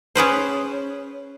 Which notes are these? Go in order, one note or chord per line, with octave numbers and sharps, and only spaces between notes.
C#4 G#4 B4 C5